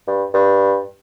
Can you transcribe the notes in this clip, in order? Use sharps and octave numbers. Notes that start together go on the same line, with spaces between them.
G2
G2